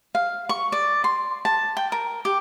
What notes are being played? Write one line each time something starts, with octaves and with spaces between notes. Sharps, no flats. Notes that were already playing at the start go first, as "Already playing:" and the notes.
F5
C#6
D5
C6
A5
G5
A#4
G4